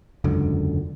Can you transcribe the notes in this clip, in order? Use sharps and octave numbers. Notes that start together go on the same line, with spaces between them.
E1 C#2 F#2 D3